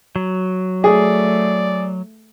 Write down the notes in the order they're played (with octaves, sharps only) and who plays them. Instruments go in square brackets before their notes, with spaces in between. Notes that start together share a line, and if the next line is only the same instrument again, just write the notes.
[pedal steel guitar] F#3
[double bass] A3 [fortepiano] G#4 [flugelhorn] D5